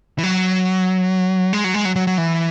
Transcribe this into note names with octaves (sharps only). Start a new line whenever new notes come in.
E3
F#3
G#3
F#3
G#3
F#3
F#3
F#3
E3